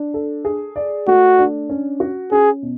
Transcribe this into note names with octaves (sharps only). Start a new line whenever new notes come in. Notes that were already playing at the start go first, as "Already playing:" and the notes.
Already playing: D4
A4
G#4
D5
A3 F#4
D4
C#4
F#4
C#4 G#4
B2